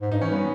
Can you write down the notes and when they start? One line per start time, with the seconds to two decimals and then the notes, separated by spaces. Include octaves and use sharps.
0.01 G#2
0.11 G2 D#4
0.22 E3 C#4
0.31 G3 B3